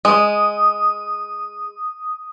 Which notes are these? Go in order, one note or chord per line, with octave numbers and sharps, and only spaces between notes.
G#3 D#6